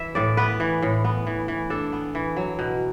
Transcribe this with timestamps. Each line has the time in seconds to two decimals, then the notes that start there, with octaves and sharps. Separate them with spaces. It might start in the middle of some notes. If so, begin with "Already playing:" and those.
Already playing: E3 E5
0.15 A2 D5
0.37 B3 B4
0.60 E3
0.82 A2
1.04 B3
1.27 E3
1.48 E3
1.70 D4 A4
1.93 B3
2.15 E3
2.36 F#3
2.59 B2